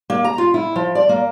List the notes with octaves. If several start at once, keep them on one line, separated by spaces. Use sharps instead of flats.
A#3
A#5
F4
E4
F3
D5
A#3